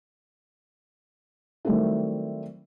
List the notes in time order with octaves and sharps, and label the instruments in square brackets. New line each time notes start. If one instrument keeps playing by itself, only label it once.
[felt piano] D#3 F#3 G3 A3 C4 E4